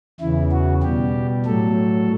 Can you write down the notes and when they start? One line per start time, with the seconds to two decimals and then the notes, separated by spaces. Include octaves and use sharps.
0.20 E2 C#3 E3 E4
0.52 F#4
0.83 B2 G3 G4
1.46 A2 F#3 A4